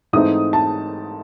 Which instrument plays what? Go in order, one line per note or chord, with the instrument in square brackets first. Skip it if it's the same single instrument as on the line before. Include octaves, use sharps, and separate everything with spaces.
[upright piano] G#2 E3 A3 C4 D#4 D#6
A5